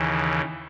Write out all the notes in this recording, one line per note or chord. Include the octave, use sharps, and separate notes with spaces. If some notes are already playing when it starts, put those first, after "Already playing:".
Already playing: D#2 C#3 E3